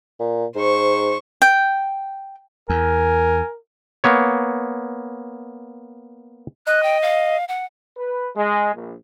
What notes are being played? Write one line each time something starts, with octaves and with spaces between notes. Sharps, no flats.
A#2
G#2 C5 C#6
G5
E2 A#4 G#5
A#3 B3 C#5
D#5 F#6
G5
F5
F#5
B4
G#3
A#1